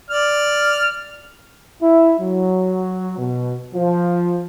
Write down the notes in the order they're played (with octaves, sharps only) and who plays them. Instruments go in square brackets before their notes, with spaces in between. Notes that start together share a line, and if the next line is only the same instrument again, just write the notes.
[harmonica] D5 F6
[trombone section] E4
F#3
B2
F3